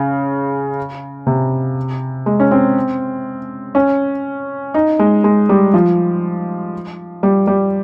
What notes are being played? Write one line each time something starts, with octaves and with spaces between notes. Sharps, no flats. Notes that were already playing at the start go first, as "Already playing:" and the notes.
Already playing: C#3
C3
G#3
C#4
C4
C#4
D#4
G#3
G#3
G3
F3
G3
G3